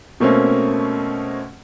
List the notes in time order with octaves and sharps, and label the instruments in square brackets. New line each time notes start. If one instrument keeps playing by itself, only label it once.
[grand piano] B2 A3 A#3 C4 C#4